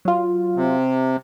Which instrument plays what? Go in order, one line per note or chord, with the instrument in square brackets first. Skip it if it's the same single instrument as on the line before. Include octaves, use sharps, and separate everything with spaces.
[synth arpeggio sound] F#3 F4
[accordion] C3